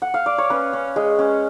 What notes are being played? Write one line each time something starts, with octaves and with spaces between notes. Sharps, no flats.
F#5
F5
D5
C#5
C#4 B4
C#4
G#3
C#4